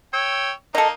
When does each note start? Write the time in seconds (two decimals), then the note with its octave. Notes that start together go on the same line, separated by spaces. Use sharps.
0.14 C#5 G5 E6
0.75 A#3 D#4 A4 D#5